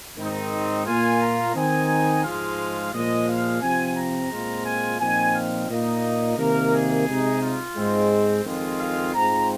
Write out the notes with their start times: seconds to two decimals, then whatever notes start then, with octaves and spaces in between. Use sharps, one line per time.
0.17 G#2 D#3 C4 D#4
0.86 A#2 A#3 F4 G#5
1.20 A#5
1.55 D#3 C4 D#4 G#5
2.23 G#2 F3 G#3 F4 F5
2.93 A#2 F3 G#3 D#5
3.28 F5
3.62 C3 F3 C4 F4 G#5
3.96 A#5
4.31 A#2 G#3 C4 F4
4.66 G#5
5.00 A#2 F3 C4 D#4 G#5
5.35 F5
5.69 A#2 A#3 D#4 D#5
6.38 C3 D#3 A#3 D#4 A#4
6.73 G#4
7.07 C3 G#3 D#4
7.42 F4
7.76 G#2 G#3 C4
8.45 F2 D#3 G#3 F4
8.80 F5
9.14 G#2 G#3 C4 F4 A#5